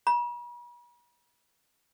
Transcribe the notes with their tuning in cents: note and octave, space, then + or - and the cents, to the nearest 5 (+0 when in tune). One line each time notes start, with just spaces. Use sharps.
B5 -45